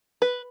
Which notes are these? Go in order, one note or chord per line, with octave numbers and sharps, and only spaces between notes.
B4